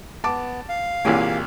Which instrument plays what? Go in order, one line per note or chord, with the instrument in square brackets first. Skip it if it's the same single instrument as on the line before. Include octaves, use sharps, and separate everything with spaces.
[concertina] B3 [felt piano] A5 D6
[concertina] F5
[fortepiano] C2 A#2 C#4 [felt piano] E3 [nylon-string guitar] A#3 G4 G#4